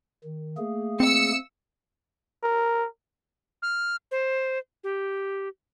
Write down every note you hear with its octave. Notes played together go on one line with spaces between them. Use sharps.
D#3
A3 A#3 G#4
C4 E6 C#7
A#4
F6
C5
G4